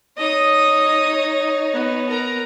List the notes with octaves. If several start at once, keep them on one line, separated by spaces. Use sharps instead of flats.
D#4 C#5 D#5 D#6
B3
A#4 A#5